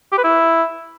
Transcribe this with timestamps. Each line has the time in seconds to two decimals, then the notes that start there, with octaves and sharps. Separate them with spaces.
0.12 G4
0.18 B4
0.24 E4